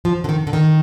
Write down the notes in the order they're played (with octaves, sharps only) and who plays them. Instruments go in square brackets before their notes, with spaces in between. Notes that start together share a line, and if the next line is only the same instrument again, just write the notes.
[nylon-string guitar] F3
D3
D#3
D3
D#3